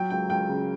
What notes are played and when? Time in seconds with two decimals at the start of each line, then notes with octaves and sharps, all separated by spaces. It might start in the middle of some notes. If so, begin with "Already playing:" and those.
Already playing: F#3 G5
0.10 C#2 G5
0.29 C#2 G5
0.49 C#3